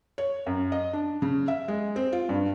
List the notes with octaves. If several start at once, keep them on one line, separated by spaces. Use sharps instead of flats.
C#5
F#2
D#5
D4
C#3
E5
G#3
C4
F4
G2